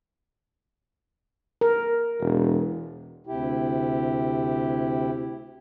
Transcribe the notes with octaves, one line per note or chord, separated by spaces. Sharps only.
A#4
E1
D2 C3 E4 G4